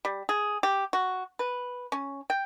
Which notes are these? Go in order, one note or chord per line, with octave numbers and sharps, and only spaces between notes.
G3
G#4
G4
F#4
B4
C#4
G5